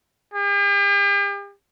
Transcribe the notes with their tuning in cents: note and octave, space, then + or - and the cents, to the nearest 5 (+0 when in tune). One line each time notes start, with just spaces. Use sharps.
G4 +45